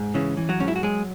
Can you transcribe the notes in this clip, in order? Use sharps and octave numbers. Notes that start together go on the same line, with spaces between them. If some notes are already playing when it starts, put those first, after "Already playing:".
Already playing: G#2
C#3 E3 C#4
E3
F#3 F#4
G#2 C#4
E4
F#4
F#3 G#3 G#4